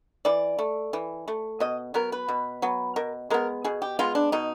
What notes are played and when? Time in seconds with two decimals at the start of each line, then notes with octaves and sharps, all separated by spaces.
0.25 E3 D5
0.59 A3
0.93 E3
1.28 A3
1.60 B2 D#5
1.94 F#3 B3 A#4
2.12 B4
2.29 B2
2.62 F#3 B3
2.96 B2 A#4
3.30 G#3 B3 A#4
3.65 B2 G#4
3.82 G4
3.99 G#3 B3 F4
4.15 D4
4.32 B2 D#4